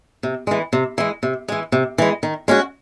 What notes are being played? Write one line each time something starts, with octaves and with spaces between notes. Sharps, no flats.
C3
E3 G#3
C3
E3 G#3
C3
E3 G#3
C3
E3 G#3
D#3
G#3 C#4 F#4